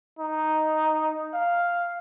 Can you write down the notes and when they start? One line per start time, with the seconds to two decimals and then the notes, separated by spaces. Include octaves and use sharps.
0.19 D#4
1.34 F5